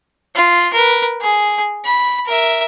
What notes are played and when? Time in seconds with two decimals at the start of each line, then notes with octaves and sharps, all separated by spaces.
0.36 F4
0.73 A#4 B4
1.21 G#4
1.85 B5
2.26 A#4 E5